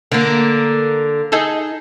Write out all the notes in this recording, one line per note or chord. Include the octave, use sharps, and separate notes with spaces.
D3 A#3
D#4 G#4 A4